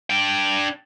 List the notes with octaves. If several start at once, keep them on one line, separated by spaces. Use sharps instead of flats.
D4 G5